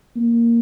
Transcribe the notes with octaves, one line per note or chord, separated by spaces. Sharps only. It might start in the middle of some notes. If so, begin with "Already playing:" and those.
A#3